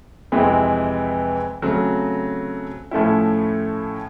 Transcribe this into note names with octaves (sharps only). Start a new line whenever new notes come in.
F2 C3 E3 G#3 C4
C#3 F#3 A3 C4
A2 F3 A3 C#4 E4